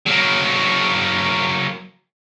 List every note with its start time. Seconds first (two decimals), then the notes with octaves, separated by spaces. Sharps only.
0.06 F#3 A#3